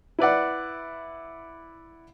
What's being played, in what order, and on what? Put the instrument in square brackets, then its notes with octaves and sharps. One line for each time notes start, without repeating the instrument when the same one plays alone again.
[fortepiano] E4 B4 D5 F#5